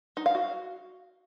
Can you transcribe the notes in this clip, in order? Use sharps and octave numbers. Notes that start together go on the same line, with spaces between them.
D#4
F5
F#4